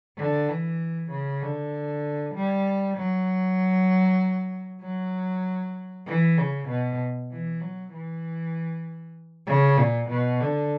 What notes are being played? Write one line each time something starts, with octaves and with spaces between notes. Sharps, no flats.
D3
E3
C#3
D3
G3
F#3
F#3
E3
C#3
B2
E3
F#3
E3
C#3
A#2
B2
D3